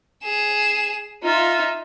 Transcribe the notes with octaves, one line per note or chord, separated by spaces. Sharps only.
G#4 E7
D#4 F4 E5